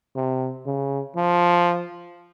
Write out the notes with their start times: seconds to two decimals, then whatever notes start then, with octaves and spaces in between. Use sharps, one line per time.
0.15 C3
0.66 C#3
1.16 F3